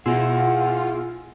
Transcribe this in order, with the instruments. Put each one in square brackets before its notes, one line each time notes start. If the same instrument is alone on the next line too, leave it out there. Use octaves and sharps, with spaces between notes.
[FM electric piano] B2 C6 E6 [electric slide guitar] E4 G#4 [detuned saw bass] F4 [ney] F#5